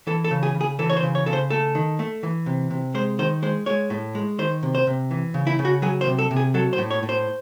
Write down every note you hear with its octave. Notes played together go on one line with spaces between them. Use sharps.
E3 A4
A4
C#3
G#4
C#3
G#4
E3 A4
C#5
C5
C#3
C#5
C#3 A4
C5
A3 A4
D#3
A3
E3
C3
C3
G#3 C5
D#3 C5
G#3 C5
G#3 C#5
A2
G#3
D#3 C5
C3
C5
C3
E3
C#3
E4
C#3
F#4
F#3 G#4
C5
C3
A4
C3
G#4
F#3 A4
C5
A2
C#5
A2
C5